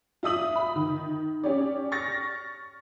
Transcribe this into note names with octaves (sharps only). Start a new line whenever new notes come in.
F4 E5 D#6 F#7
B5
D#3
C#4 G4 C#5 D5
C#6 F6 A6 A#6